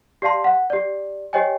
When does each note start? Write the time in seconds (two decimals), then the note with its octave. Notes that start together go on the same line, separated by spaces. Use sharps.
0.22 G4 D5 F5 A5 C6
0.44 F#5
0.70 G4 D5
1.33 G4 C5 C#5 D#5 G5 G#5